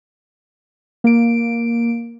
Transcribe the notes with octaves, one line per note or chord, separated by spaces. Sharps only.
A#3 D7